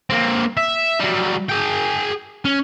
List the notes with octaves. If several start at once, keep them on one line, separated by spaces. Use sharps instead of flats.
A#3 C4
E5
F#3 G3
G#4 G5
C#4